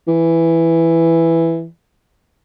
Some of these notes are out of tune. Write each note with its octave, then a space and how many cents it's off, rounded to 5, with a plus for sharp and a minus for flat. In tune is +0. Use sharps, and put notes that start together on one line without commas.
E3 +5